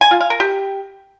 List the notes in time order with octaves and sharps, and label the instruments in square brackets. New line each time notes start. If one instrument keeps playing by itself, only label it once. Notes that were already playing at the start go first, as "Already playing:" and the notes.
[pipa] G#5
F4
F5
A#4
G4